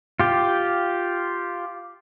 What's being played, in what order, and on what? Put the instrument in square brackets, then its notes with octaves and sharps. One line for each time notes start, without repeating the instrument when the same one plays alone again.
[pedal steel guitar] F4 G4